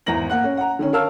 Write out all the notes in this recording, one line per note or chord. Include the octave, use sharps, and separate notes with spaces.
G#1 E2 E3 A#5 A#6 F#7
A#3 F#5 F#6
C#4
F#5 A#5
D3 D#3 C#4
A#4 C#5 F5 A5 E6 F6